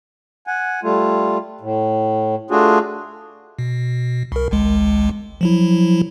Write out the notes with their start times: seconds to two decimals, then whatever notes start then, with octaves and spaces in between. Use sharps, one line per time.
0.47 F#5 G#5
0.83 G3 A3 F4
1.61 A2
2.51 A3 D4 F4 F#4 G#4
3.59 B2
4.32 C2 A#4
4.51 G#1 C#2 G#3
5.41 F3 F#3 E4